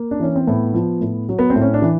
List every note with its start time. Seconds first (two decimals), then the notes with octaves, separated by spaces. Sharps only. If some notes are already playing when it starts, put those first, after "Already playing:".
Already playing: A#3
0.11 D4
0.20 E3 C#4
0.35 C4
0.47 A2 B3
0.74 F3
1.01 A2
1.29 F#3
1.39 B3
1.50 C4
1.55 A2
1.62 C#4
1.74 D4
1.82 E3